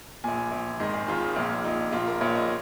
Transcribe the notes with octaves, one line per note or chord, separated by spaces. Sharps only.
A#1 A#2 G#5
A#1 A#2
G#1 G#2 D#3 D#5
G#4
G#1 G#2 D#3 F4
A#1 A#2
A#1 A#2 D#4
A#1 A#2 F4
A#4
A#1 A#2 C#5
D#5